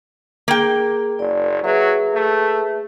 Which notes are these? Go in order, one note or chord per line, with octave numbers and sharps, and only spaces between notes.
A#3 G#4 G5
F#1 D5
F#3 G#4 B4 E5
A3